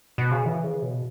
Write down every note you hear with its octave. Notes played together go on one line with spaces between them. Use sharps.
B2
C#3
E3
C#3
B2